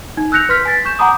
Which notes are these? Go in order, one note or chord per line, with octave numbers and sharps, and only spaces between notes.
D#4
E6 F#6 G6 A#6 C#7 F7
B4 C6 F6 B6
G#5 A6 B6
C#6 G6 E7
F#5 G#5 A#5 B5 D6 D#6